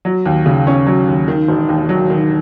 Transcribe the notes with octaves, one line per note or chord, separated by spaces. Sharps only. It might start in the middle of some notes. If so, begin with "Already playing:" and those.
F#3
D#2
C#3
C#4
F#3
D#2
D#3
E1
D#2
F#3
D#3